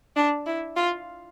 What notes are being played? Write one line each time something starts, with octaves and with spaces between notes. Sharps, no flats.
D4
E4
F4